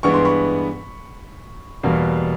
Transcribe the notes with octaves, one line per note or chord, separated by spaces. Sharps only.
G2 E3 G#3 B3 C#6
C6
B5 C#6
E2 B2 G3 A#3